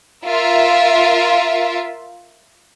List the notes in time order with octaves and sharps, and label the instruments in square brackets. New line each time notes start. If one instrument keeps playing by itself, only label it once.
[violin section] F4 A#4 E5